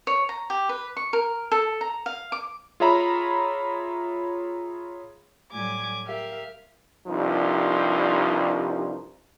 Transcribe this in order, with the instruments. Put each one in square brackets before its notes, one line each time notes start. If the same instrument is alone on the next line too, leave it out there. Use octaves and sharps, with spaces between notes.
[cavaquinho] C#5
A#5
G4
B4
C#6
A#4
A4
A#5
F5
D6
[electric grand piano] F4 G#4 C#5 E5 A#5 B5
[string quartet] A2 F#3 G3 G#5 D6 G#6
G4 A#4 E5 F5
[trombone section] C2 G2 F3 D#4